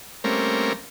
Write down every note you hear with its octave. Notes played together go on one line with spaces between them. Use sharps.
G3 A3 A#3 C4 C#4 A#4